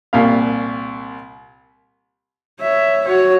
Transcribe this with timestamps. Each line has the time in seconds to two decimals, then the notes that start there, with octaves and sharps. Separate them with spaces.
0.13 C2 A#2 F5
2.61 C#5 E5
3.05 F#4 C#5